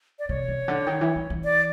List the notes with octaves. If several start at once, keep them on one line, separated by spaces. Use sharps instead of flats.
D5
C3 C#5
C3
D3
D#3
E3
E3
E3
D5